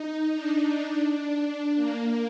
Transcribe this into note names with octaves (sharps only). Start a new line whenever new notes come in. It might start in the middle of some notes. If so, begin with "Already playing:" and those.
Already playing: D#4
D4
D4
A#3